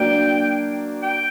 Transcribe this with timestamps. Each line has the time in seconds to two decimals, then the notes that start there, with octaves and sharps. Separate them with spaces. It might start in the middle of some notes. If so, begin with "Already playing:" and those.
Already playing: F#3 A#3 D4 G5
1.03 G5